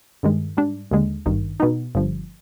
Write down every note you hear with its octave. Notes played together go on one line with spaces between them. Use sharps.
G2 D#3 G#3
G#2 G3 D4
D#2 D3 G#3
G#1 G2 D#3
B2 B3 D#4
G1 G2 F3